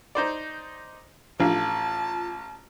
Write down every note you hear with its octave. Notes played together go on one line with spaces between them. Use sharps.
D#4 C5 D5
A1 F3 D4 F4 F5 A5